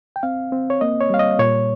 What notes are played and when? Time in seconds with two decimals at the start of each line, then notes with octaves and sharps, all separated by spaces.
0.16 G5
0.23 C4 F5
0.52 C4
0.70 C#5
0.81 A#3 D#5
1.01 C#5
1.10 G3 F5
1.19 D#5
1.39 A#2 C#5